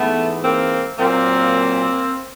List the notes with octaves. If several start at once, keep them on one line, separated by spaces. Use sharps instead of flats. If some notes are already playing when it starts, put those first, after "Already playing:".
Already playing: G#2 E3 A3 B3
A#3 C4
A#2 F#3 A#3 C4